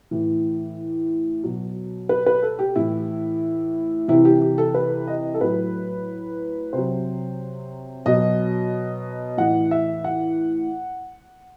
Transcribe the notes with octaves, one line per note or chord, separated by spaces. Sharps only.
A2 E3
B2 F#3
B4
B4
A4
G4
A2 E3 E4
C3 E3 E4
G4
G4
A4
B4
D#5
A4
A2 F#3 B4
C3 F#3 C5
B2 F#3 D#5
A2 E3 F#5
E5
F#5